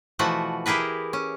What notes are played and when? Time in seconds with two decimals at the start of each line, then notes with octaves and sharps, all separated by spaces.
0.19 B2 E3 F3 A3 F#4 F#5
0.66 E4 G4 G#4 A#4 B4
1.13 C#4